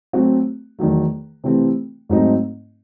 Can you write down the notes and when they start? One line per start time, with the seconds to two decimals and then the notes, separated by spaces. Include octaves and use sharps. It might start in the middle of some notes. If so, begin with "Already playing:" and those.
0.13 F#3 A3 C4 F#4
0.79 E2 D#3 F#3 A3
1.44 C3 E3 A3 C4
2.09 G#2 F#3 A3 C4 D#4